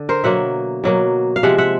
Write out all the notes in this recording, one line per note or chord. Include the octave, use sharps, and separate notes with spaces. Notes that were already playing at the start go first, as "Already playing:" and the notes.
Already playing: D3
A#4 C5
B2 F#3 A#3 E5 F#5
B2 F#3 A#3
F5
C3 F3 G#3 E5 F#5
E5 F#5